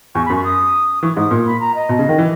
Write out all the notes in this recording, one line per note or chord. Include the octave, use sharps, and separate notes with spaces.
E2 C#6
F#2 B5
C#6
D#6
E3 C#6
G#2 D#6
A#2
B5
A#5
D#5
B2
C#3
D#3
E3